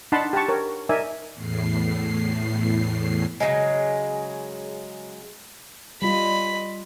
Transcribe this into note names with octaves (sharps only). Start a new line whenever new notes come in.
D4 D#4 F#5 A5 B5 C6
G4 F#5 A5 C#6
A#4 C#5
D#4 A#4 D5 E5 G#5
E2 A2 C7
C#3 E3 F#3 G#3
G3 F4 D#5 B5